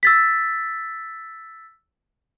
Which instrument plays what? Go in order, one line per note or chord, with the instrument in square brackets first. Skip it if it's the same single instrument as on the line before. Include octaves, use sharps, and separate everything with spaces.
[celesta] E6 A6 B6